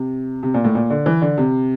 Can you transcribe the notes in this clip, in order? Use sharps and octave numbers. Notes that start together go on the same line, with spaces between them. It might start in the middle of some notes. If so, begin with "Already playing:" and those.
Already playing: C3
C3
A#2
A2
A#2
D3
E3
D3
C3